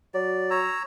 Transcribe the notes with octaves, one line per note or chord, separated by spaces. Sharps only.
F#3 D5
C#5 A#5 E6